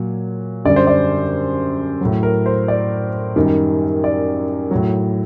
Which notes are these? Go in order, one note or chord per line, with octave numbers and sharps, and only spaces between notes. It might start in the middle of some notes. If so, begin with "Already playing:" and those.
Already playing: A#2 F#3
F#2 D3 G3 D5
C5
D5
A2 F#3
A#4
C5
D5
F#2 D#3 G3
D5
A2 F#3